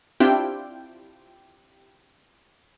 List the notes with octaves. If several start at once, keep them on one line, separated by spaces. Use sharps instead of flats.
C4 D4 E4 F4 G4 G5